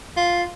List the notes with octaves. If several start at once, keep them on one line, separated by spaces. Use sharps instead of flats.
F4